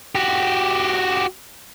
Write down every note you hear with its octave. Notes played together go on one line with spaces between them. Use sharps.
F#4 G4